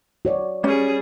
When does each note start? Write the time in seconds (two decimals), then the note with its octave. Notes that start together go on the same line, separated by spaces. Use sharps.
0.25 F#4 C#5 D5
0.64 G3 C#4 G#4